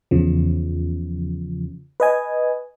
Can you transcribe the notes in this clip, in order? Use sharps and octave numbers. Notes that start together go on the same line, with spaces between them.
E2 C#3 F3
B4 D#5 G#5